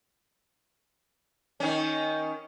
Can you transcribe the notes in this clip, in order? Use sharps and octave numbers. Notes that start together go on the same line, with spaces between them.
D#3 C#4